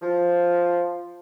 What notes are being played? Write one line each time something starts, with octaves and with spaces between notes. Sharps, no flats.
F3